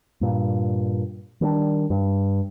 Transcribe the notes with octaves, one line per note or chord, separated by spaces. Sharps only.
G2 A#2
D#3 G3 C4 D4
G2